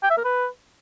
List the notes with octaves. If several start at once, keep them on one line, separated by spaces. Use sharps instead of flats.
G5
E5
A#4
B4